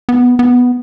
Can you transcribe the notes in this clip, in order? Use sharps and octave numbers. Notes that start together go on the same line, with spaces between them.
B3
B3